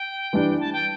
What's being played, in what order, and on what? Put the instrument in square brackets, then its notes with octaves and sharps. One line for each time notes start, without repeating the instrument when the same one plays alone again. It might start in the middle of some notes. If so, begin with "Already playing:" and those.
Already playing: [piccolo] G5
[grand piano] E3 G3 D4
[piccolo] A5
G5